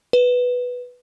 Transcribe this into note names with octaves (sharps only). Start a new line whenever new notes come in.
B4